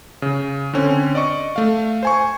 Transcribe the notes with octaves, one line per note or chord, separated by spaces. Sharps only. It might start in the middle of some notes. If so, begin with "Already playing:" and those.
C#3
D3 C4 C#4
D5 D#5 C#6
A3 F5
C5 G#5 C#6